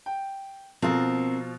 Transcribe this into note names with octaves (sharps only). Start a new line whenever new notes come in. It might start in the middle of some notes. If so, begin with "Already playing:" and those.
G5
B2 F3 C4 F4 A#4